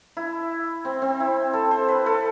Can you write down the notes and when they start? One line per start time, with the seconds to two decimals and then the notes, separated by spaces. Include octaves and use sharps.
0.17 E4
0.85 C4
1.02 C4
1.20 E4
1.53 A4
1.71 C5
1.89 B4
2.06 A4